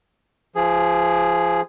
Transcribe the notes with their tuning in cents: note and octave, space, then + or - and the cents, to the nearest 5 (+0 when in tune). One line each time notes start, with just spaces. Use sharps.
F3 -20 G#4 +0